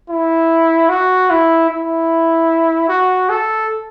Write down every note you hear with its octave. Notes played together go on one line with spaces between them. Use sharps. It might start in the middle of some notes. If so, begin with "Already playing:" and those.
E4
F#4
E4
E4
F#4
A4